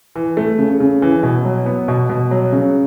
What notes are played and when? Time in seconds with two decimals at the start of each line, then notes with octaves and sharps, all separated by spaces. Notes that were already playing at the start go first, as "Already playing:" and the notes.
0.16 E3
0.37 A3
0.59 C#3
0.80 C#3
1.02 E3
1.23 B2
1.45 F#3
1.66 B3
1.88 B2
2.10 B2
2.31 F#3
2.52 C#3